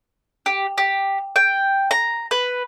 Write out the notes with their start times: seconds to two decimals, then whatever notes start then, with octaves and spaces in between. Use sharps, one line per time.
0.46 G4
0.78 G4
1.36 G5
1.91 A#5
2.31 B4